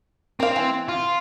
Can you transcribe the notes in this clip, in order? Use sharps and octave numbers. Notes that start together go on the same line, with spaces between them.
C4 A#4 F5
E3
F4